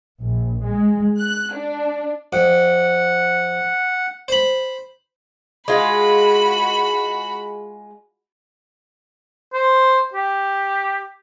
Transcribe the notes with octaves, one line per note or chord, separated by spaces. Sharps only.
A#1
G#3
F#6
D4
F2 F#5
C5 B5
G#3 F4 F#4 B5
C5
G4